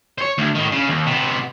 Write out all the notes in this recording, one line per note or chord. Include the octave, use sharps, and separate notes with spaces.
C5 C#5
D2
A2 D#3
C#3
D#2
C3 B3